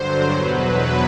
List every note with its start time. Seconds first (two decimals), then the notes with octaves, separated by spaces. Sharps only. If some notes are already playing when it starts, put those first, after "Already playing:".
Already playing: G2 D3 F#3 C5
0.30 E2 B2 F#3 B4